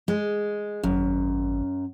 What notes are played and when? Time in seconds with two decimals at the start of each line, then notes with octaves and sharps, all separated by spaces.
0.08 G#3
0.83 G#1 F#2